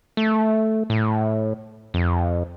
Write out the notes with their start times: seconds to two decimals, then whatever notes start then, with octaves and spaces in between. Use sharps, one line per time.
0.17 A3
0.90 A2
1.94 F2